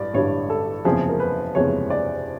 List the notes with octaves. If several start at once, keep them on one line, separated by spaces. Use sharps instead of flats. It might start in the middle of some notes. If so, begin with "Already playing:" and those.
Already playing: A1 G2 D5
A1 G2 D3 G3 C#5
A4
F#1 E2 C3 F3 G#3 G#4
A#4
B4
F#1 E2 C3 F3 G#3 C#5
D5